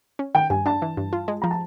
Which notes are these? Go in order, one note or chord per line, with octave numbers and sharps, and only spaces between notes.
C#4
D#3 G5
G2 G#5
D4 A5
E3
G2
F4
G#3
F3 A#5
A5